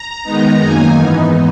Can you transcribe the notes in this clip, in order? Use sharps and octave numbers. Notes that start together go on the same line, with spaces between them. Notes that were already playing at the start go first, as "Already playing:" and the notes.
Already playing: A#5
D#3 G#3 B3 D#4
F#2 D#3 A#3 D#4 G#5
G#2 E3 B3 D#4